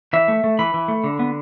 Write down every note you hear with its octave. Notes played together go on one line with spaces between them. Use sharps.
E3 E5
A3
A3
E3 B5
E3
A3
D3
B3